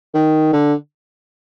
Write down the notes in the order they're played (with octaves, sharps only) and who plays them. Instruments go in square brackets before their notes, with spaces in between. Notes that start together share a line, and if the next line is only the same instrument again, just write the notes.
[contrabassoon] D#3
D3